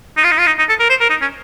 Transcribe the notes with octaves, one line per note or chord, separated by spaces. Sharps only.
D#4
F4
D#4
F4
D#4
D#4
A4
A#4
C5
A#4
D#4
C#4